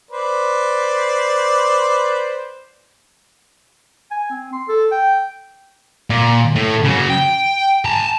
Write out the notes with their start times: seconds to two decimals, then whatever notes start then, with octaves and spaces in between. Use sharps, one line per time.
0.11 B4 C5 D5
4.11 G#5
4.31 C4
4.53 C6
4.68 A4
4.91 G5
6.10 A#2
6.55 A2
6.84 C#3 F#3
7.10 G5
7.85 A5 A#5